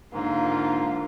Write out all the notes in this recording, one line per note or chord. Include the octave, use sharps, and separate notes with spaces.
G#2 D3 A#3 F4